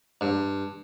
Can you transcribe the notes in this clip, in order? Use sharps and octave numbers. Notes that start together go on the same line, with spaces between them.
G2